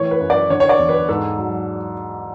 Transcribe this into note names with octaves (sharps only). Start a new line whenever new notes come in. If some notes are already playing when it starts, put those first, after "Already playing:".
Already playing: A2 E3 C#5
B4
F#2
D5
D3 C#5
C#5
D5
E2
B4
G#2 A4
F#3